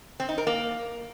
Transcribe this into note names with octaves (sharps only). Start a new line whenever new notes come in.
C4
D#4
A#4
A#3